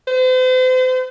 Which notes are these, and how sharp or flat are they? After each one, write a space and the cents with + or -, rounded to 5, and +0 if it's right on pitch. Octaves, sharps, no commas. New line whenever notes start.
C5 -40